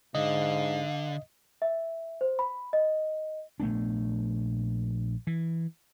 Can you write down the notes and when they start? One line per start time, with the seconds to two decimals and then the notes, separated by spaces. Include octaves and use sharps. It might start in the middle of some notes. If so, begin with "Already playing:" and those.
0.15 G#2 D3 D#5 F5
1.62 E5
2.21 C5
2.39 B5
2.73 D#5
3.60 A#1 A3 B3 D4
5.27 E3